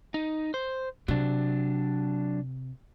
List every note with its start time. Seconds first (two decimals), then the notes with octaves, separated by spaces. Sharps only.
0.14 D#4
0.54 C5
1.08 C3 F#3 D4